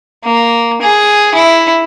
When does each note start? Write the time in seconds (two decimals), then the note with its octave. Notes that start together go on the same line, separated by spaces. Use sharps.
0.24 A#3
0.81 G#4
1.34 E4